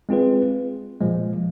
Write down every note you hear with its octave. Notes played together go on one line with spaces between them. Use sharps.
G#3 C4 F4 G#4 B4
A#2 F3 G#3